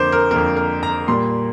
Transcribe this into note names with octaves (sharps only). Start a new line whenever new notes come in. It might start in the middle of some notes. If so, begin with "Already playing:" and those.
Already playing: F2 D3 A#3 C5 D6
A#4
F2 D3 A#3 A#4
A#4
A#5
A#2 G3 A#3 C6